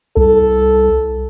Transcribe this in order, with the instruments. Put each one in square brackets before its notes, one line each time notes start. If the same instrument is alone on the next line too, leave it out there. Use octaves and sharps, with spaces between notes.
[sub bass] C2 [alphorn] A4